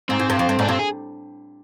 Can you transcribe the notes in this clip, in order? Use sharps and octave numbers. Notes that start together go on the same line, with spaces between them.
G#2 C4
G#2
G2
F2
G2
G#2 D4
G2 C4
G#4